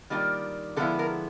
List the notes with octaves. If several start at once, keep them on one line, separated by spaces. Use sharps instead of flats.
D#3 G3 A#3 D4 F4
D3 F3 G#3 B3 E4 A4
A#4